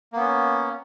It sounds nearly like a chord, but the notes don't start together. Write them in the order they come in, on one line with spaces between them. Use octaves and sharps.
A#3 B3 C#4